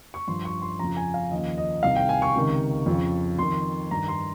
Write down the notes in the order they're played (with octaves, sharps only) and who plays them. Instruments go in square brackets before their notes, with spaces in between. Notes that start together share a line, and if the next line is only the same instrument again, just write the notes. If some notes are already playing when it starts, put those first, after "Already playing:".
[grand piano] C#6
G2 F3 C6
C#6
C6
F2 C#3 F3 A#5
G#5
F5
D#2 C#3 F3 D#5
D#5
C2 C3 D#3 F5
G5
G#5
C#6
C#2 C3 D#3
F2 C#3 F3
F2 D#3 C6
G2 D#3 A#5
C6